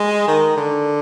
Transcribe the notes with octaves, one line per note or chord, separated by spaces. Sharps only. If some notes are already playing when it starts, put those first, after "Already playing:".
Already playing: G#3
D#3
D3